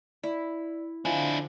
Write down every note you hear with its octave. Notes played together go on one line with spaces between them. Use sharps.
E4 D5
D3 F3 D4 E4 G#5